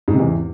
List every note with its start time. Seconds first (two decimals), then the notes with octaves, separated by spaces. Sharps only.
0.08 G#2
0.13 C3
0.19 E2